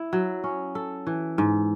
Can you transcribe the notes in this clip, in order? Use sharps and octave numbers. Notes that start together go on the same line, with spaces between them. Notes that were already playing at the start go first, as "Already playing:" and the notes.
Already playing: E4
F#3
C#4
A4
E3
G#2